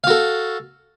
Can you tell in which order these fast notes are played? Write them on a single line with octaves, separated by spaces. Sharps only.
F5 F#4 A4